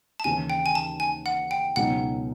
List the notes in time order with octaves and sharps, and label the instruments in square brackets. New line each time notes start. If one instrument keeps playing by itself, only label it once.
[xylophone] A5
[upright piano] D#2 C#3 E3 [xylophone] G#5
[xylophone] G5
G#5
A5
G#5
F#5
G5
[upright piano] C#2 B2 F#3 B3 D#4 [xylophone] F#5